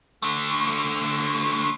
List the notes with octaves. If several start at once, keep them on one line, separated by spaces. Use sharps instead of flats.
D3 A3